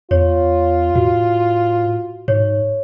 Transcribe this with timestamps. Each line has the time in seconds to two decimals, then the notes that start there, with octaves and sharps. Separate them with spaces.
0.11 E2 F4 C#5
0.96 A2 F#4
2.28 G#2 C#5